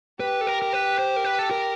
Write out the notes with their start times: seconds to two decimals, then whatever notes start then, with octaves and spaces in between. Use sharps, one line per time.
0.20 G4 B4
0.41 A4
0.47 A#4
0.62 A#4
0.73 B4
0.99 C5
1.16 A#4
1.25 B4
1.39 A4
1.51 A#4